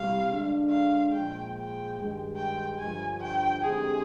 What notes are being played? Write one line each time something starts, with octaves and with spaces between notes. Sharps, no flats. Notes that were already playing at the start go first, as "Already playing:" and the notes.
Already playing: C2 C3 G3 F5
D3 G#3 D4
F5
A#2 F3 G#3 G5
G5
G2 D#3 G#3
G5
G2 D3 F3 G#5
G5
D3 G#3 C4 D#4 G4 G#4